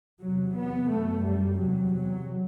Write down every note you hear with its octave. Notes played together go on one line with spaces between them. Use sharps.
E2 C3 F#3
B3
F#2 A3
G3
E2 C3 F#3
F#3